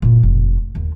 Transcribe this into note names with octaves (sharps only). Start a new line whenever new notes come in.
F#1 A#2
F1
D#2